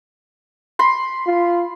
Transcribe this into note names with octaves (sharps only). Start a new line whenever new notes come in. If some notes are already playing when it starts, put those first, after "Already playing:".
B5 C6
F4